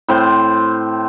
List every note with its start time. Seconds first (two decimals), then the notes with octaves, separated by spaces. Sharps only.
0.09 A2 C4 C5 C6